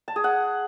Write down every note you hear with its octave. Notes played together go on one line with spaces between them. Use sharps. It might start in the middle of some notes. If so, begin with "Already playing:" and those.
A5
G#4
F#5